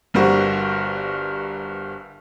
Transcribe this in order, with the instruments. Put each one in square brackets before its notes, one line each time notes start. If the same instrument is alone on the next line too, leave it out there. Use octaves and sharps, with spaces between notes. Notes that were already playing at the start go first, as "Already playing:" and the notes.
[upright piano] G1 G2 F#4 A#4 C5 C#6